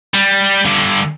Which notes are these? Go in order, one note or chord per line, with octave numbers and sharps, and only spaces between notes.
G3
G2 D3